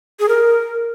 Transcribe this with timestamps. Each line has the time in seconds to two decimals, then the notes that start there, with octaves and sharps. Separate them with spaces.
0.20 G#4
0.29 A#4